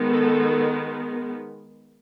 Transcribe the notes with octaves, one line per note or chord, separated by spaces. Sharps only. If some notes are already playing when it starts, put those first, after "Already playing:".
Already playing: D#3 G#3 B3
A4